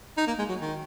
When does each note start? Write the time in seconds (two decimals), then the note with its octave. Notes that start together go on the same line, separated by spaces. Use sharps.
0.17 D#4
0.27 A#3
0.39 G#3
0.49 F#3
0.60 D#3